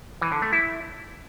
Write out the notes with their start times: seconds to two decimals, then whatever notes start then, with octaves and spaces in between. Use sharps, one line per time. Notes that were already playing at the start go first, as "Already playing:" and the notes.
0.22 E3
0.32 D3
0.42 A3
0.52 E4